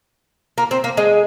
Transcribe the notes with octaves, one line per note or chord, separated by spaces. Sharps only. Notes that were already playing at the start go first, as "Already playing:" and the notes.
A#3
C4
A#3
G#3